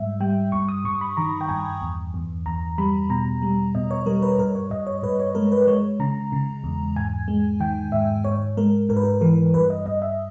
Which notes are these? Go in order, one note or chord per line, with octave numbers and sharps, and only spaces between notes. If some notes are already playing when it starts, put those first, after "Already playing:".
Already playing: G#2 G3 E5
G3 G5
G2 C#6
D#6
G2 C#6
B5
D#3 A#5
G5
G2 G#5
E2
E2
E2 A#5
G3 B5
B2 A#5
G3
B2 D#5
C#5
G3 A#4
B4
G2 A#4
C#5
G2 D#5
C#5
G2 B4
C#5
G#3 A#4
B4
G#3 C#5
C#3 A#5
C#3
E2
G#2 G#5
G#3
D#3 G5
G#2 E5
G#2 C#5
G#3 A#4
G#2 A#4
B4
A#4
E3 A#4
G2 B4
D#5
G2 D#5
E5